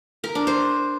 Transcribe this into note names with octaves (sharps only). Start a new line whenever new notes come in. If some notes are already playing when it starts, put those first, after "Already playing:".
A#4
D4
C5